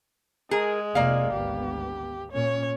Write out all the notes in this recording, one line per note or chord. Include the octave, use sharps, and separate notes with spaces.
G#3 G#4 A#4
F1 A#3 D5 F5
G#1 D2 B3 G4
A#2 C#4 C#5